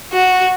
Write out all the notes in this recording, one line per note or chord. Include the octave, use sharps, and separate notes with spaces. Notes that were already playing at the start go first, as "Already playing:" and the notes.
F#4